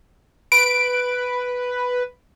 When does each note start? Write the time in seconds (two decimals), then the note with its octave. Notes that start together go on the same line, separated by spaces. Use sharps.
0.52 B4 D7